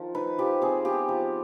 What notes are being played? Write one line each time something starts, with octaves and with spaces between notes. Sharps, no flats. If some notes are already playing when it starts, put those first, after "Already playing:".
Already playing: D#3 F3
D#4 B4
F3 G4
C4 G#4
B3 G4
F3